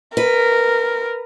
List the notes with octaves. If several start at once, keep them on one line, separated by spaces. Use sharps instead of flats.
A#4 B4